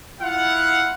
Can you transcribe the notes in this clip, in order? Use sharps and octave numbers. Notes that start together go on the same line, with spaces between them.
E4 F4 F5 F#5